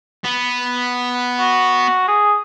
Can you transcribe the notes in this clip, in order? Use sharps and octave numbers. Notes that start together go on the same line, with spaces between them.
B3
F#4
G#4